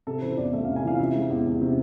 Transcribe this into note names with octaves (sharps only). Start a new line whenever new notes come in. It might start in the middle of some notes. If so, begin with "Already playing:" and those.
C3 A4
E3 C5
E2 D5
A3 E5
F5
C3
G#5
E3 F5
C3 E5
G#3
E2
E2
C3